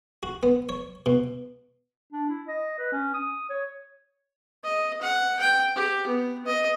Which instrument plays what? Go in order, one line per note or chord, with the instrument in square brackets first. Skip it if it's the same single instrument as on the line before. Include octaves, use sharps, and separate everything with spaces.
[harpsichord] F#4
B3
C#5
B2
[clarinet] D4
E4
D#5
B4
C#4
D#6
C#5
[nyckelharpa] D#5
F#5
G5
G4
B3
D#5